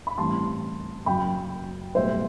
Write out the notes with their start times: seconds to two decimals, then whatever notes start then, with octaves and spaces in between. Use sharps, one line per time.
0.07 B5
0.18 A1 G2 E3 G3 C4 A5 C6
1.06 F#1 F#2 F#3 G5 B5
1.95 B1 A2 G3 C5 E5